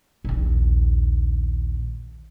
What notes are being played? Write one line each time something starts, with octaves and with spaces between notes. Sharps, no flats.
A#1 D#2